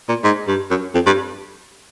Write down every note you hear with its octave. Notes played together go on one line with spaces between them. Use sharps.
A#2
G#2
G2
F#2
F2
G2